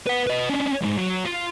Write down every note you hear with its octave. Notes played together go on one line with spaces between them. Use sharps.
B4 F#5
B4 D#5
C#4 D4
C#2 G#2
F#3
F4